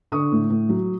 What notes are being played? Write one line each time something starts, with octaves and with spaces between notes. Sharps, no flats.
D3 C#6 D#6
A2
A2
F#3